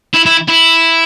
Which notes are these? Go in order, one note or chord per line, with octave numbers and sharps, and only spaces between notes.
E4
E4
E4